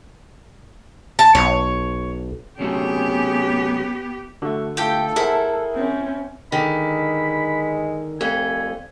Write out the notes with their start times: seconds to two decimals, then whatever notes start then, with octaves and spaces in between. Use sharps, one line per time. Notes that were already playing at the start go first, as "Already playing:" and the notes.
1.19 A5
1.35 B1 C#5
2.59 C3 F#3 A3 B3 C#4 G4 G#4
4.42 D3 A3 F#4
4.77 A3 F4 G4 A4 G5
5.16 E4 G#4 A#4 C5 E5 F#5
5.75 C4 C#4
6.52 D3 D#3 G#3 B5
8.21 C2 F2 A3 G#5